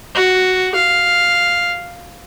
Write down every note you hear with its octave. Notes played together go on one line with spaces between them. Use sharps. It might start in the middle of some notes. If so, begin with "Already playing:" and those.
F#4
F5